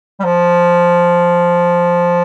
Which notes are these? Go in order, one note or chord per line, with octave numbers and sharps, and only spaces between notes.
G3
F3